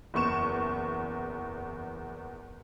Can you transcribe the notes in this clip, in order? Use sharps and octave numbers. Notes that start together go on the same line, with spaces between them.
F#1 E2 C#6 E7